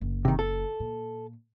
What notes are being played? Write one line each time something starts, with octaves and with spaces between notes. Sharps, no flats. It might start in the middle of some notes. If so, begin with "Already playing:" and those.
F#1
C3 D#3
A4
A#2